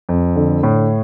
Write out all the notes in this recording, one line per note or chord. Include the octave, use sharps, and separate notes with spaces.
F2
D3
A2